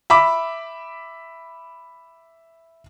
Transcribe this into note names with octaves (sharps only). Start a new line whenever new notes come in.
E5 B5 D6